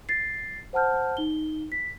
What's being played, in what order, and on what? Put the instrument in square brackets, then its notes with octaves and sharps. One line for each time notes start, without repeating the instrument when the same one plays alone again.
[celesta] A6 C7
C5 F#5 A5 F6 G6
D#4 G7
B6